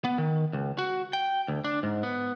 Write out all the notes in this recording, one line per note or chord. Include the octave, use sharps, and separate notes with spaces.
B3
D#3
C#2
F#4
G5
D2
D4
G#2
B3